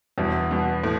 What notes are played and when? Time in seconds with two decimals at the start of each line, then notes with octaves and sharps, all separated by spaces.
0.18 E2 G2 B2
0.51 G2 B2 B3
0.83 A2